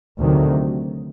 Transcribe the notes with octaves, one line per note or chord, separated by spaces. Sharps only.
D2 C3 D#3 F#3